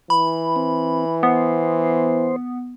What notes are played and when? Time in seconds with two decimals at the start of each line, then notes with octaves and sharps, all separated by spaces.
0.10 E3 B5
0.56 C4
1.23 B3 C5